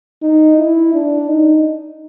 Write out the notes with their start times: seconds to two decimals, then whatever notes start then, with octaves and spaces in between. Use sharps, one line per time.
0.22 D#4
0.58 E4
0.93 D4
1.28 D#4